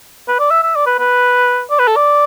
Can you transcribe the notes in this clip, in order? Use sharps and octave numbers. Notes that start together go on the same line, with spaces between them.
B4
D5
E5
E5
D5
B4
B4
D5
B4
A4
D5